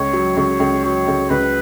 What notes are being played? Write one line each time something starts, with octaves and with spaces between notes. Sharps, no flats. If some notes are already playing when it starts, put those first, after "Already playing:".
Already playing: C#2 C#5
F#3
C#2 C#5
C#2
F#3 C#5
C#2
C#2 B4